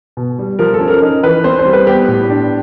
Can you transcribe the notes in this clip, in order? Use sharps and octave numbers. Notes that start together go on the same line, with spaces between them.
B2
G3
F3 A#4
A4
C#4
A#4
D#4 A#4
E3 B4
C4 C5
C5
G3
B4
B3 G4
A2
D4